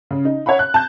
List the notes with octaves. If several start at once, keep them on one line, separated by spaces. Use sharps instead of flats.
C#3
D#4
C#5 E5 F#5 B5
F#6
A5 G6